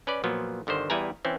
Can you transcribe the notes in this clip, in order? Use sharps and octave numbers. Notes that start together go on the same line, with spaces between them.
C#4 B4 D5
A#2 F3 F#3 B3
G1 D3 D#3 C5
E2 G3 E4 B4 G#5 A#5
E3 C4 C#4